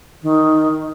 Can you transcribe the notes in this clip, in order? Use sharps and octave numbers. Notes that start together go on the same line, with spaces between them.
D#3